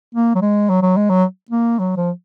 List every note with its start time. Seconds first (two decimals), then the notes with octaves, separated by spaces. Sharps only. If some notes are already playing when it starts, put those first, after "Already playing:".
0.15 A#3
0.35 F#3
0.42 G#3
0.69 F#3
0.82 F#3
0.96 G#3
1.10 F#3
1.51 A#3
1.79 F#3
1.97 F3